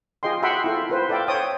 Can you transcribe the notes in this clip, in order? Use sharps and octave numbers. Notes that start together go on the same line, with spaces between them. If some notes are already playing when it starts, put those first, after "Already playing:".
F4 G#4 D#5 G5 C6
F#4 E5 F#5 G5 B5 C6
E4 F4 A4
F4 B4 C5
A4 D5 E5 F5 G5
C5 C#5 G5 D#6